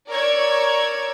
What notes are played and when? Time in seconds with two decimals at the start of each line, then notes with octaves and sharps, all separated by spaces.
0.11 A#4 C#5 D5 C#6 E6 G#6